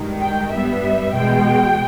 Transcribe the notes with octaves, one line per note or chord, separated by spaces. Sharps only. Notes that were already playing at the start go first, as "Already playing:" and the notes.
Already playing: G2 D#3 G#3
G5
G2 G3 B3 E5
E2 B2 G#3 G5